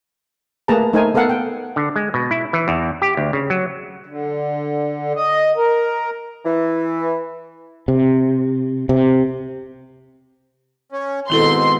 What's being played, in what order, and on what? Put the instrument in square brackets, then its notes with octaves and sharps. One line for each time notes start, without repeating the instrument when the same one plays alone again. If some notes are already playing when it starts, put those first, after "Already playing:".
[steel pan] A3 A#3 G#4 B4 A5 A#5
A3 D#4 A#4 C5 G#5
B3 A4 A#4 F5 F#5
G5
[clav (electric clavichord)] D3
G#3
B2
E4
E3
E2
G4
D2
C#3
F#3
[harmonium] D3
D#5
A#4
[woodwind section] E3
[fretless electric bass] C3
C3
[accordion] C#4
[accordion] G#2 B2 C4 [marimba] D#3 E4 A4 [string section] C6